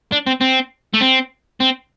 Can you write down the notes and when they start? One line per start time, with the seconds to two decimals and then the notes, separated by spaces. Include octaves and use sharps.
0.12 D4
0.27 C4
0.41 C4
0.94 A3
1.01 C4
1.61 C4